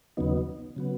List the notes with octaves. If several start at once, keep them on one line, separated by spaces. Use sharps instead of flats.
D#2 C#3 F#3 B3 D#4
C#3 F#3 B3